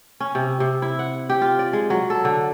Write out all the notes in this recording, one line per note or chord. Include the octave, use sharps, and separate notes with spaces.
C#4
C3
C3
E4
F#5
G4
F4
D5
G#3
F#3
A4
D3